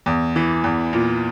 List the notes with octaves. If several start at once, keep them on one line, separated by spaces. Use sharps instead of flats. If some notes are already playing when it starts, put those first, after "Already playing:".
E2
E3
E2
A#2